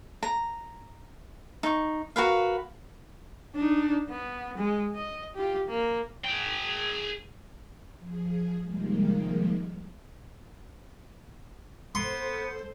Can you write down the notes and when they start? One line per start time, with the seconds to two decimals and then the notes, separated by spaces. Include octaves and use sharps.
0.23 A#5
1.63 D#4 C#6
2.16 F#4 A#4 B4 F5
3.55 D4 D#4
4.09 B3
4.58 G#3
4.95 D#5
5.35 F4 G4
5.68 A#3
6.25 G#4 G5
7.97 F3 G#4
8.63 C3 D#3 F3 G3 G#3 A#3
11.95 B3 A4 C5 C6